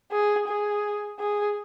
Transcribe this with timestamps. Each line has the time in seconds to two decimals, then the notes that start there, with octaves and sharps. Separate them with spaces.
0.11 G#4
0.47 G#4
1.19 G#4